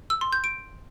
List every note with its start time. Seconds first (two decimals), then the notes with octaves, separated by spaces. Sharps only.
0.10 E6
0.21 C6
0.33 G6
0.44 D7